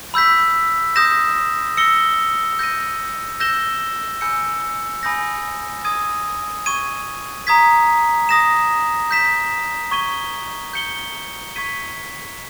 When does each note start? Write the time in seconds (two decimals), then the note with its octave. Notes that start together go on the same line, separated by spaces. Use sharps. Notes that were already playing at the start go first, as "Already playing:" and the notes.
0.14 B5 E6 G6 B6
0.96 D#6 G6 A#6 E7
1.77 E6 A#6 C#7 G7
2.59 G6 A#6 D#7
3.40 E6 G6 A#6 E7 G7
4.21 G#5 B5 E6 G6 C#7
5.03 G#5 B5 D#6 G6 A#6
5.85 D#6 G#6 D#7
6.66 C#6 G#6 D#7
7.47 A#5 D#6 G#6 B6
8.29 D#6 A#6 E7
9.11 G6 B6 E7
9.91 C#6 G#6 D#7 G7
10.73 G6 C#7 G7
11.55 C#6 G#6 B6 D#7 G7